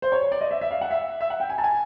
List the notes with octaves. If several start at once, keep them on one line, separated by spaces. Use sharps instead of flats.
C5
C#5
D5
D#5
E5
E5
F5
F#5
E5
E5
F#5
G5
G#5
A5
G#5